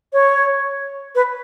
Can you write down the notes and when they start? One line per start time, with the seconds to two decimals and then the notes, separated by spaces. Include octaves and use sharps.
0.13 C#5
1.15 B4